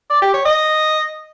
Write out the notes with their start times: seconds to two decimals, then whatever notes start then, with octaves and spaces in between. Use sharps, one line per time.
0.10 D5
0.22 G4
0.34 C#5
0.46 D#5